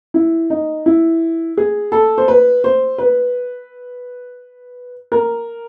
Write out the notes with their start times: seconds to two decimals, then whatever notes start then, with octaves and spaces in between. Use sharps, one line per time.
0.14 E4
0.50 D#4
0.86 E4
1.57 G#4
1.92 A4
2.18 C5
2.28 B4
2.64 C5
2.98 B4
5.12 A#4